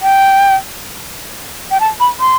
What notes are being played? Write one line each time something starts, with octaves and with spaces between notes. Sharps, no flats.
G5
G5
A5
B5
C6